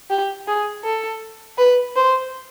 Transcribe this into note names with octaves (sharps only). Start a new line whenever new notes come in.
G4
G#4
A4
B4
C5